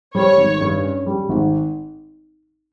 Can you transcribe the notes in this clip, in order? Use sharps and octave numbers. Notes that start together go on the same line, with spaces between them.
G3 C#5
G#1
G2
C#4
G3
G#1